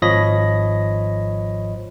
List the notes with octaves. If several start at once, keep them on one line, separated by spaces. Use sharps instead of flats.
G#1 F3 C#5 D#5 B5 A#6